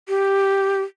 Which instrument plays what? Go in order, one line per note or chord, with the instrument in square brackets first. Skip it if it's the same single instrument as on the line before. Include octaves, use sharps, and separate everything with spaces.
[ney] G4